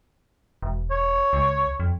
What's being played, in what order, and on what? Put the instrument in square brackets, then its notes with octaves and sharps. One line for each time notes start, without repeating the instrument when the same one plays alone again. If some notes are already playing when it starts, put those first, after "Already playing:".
[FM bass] E1
[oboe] C#5
[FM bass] C#2
F2